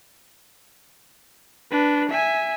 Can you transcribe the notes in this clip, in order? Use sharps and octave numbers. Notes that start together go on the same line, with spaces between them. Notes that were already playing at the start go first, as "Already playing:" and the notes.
D4 B4
E5 G#5